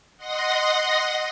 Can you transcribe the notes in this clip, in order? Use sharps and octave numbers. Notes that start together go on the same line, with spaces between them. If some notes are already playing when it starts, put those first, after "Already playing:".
D#5 F#5 C6 D#6 A#6